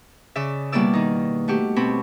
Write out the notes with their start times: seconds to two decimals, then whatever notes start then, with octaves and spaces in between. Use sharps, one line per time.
0.36 C#3 D5 E5
0.72 B2 G3 A#3 E4 D5 E6
0.93 D#3 D#4
1.48 A3 F#4 G4
1.76 B2 C4 C#5 B5